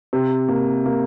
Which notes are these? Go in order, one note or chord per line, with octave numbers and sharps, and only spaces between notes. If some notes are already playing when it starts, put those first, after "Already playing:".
C3
A#3
A#3